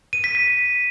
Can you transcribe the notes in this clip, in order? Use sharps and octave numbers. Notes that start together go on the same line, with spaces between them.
D#7
B6
B6